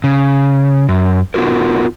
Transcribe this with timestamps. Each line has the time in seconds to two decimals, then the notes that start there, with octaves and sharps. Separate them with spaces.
0.04 C#3
0.89 F#2
1.34 B3 D#4 F4 F#4 A#4